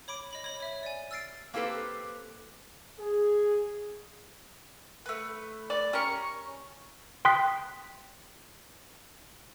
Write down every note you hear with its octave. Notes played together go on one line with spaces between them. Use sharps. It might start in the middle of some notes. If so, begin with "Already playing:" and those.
C#5 B5 D6 D7
D#5 B5 F#7
C#5 B5
C#5 E5
D5 G#5
E6 F6 A6 C7 D7
A#3 C4 G4 A4 B4
G#4
A3 B4
D5
C#4 G4 A#4 C#6
G5 C6 D#6 F#6 B6